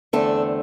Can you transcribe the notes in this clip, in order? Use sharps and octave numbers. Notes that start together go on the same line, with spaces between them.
E2 D3 A3 C4 A4